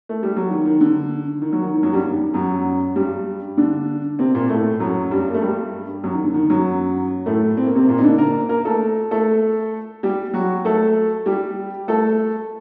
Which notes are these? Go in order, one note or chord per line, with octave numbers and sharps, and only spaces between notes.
A3
G3
F#3
D#3
D#3
D3
D#3
F#3
D#3
D#3
F#2 F#3
G2 G3
D#3
F#2 F#3
G2 G3
D3 D4
C3 C4
A#2 A#3
A2 A3
F#2 F#3
G2 G3
A#3
A3
G2 G3
F#2 F#3
D#3
D3
D#3
F#2 F#3
A2 A3
C4
A#3
C3 C4
A#2 A#3
D#4
D3 D4
A#3 A#4
A#3 A#4
A3 A4
A3 A4
G3 G4
F#3 F#4
A3 A4
G3 G4
A3 A4